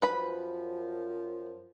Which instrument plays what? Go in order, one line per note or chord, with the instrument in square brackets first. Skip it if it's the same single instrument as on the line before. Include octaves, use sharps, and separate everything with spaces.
[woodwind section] F#2 F3 [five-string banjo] B4 B5